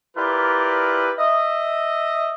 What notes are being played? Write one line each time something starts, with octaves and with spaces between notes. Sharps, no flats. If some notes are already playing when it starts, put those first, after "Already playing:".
E4 F4 G4 A#4 B4 D5
D#5 E5